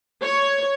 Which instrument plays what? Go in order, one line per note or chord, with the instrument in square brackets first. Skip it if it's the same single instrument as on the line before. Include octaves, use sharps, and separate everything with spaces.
[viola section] C#5